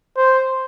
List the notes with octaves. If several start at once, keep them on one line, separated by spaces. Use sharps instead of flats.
C5